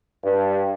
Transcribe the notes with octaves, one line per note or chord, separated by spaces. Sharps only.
G2